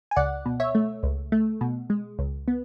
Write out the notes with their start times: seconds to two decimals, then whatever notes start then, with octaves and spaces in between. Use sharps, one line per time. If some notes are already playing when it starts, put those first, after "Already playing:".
0.11 G#5
0.16 C#2 D5 F#5
0.46 B2
0.60 C#5 E5
0.75 A3
1.03 C#2
1.32 A3
1.61 B2
1.90 G#3
2.19 C#2
2.48 B3